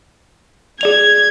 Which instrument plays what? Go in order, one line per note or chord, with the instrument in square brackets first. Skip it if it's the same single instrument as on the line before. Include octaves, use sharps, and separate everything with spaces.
[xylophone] G#4 D5 F7 [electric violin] G#6